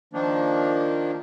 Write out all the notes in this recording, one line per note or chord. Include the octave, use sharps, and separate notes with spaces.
D#3 F3 A#3 D4